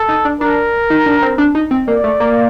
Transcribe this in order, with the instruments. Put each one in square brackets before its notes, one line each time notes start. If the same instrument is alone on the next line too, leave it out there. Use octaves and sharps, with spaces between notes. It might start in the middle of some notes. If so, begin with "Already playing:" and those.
Already playing: [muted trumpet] A4
[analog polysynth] D#4
D4
[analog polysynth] D4 [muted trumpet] A#4
[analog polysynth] D#4
D4
C4
D4
D#4
C4
[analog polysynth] A#3 [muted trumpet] D5
[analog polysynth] A3
A#3